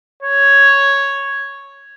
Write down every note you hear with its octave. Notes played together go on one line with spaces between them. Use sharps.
C#5